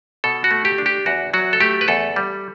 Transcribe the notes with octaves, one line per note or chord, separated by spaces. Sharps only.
B2 A4
F#4
A3
G4
D4
G4
E2 F#4
F#3 F#4
A4
A3 G4
B4
E2 A4
G3